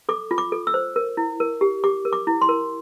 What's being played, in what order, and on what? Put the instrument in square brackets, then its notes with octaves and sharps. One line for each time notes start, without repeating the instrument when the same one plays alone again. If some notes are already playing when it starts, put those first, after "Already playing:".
[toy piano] A4 D6
F4
D6
A4
E6
C5
A#4
E4
A#4
G4
G4 D6
A#4
D6
E4
C6
A#4